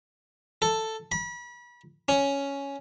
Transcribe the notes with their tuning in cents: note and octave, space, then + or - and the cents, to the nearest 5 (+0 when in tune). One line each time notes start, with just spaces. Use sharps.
A4 +5
B5 -35
C#4 +5